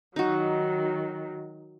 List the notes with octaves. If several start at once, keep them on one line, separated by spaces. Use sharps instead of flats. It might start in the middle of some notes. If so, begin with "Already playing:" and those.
D#3 F#3 D#4 F#4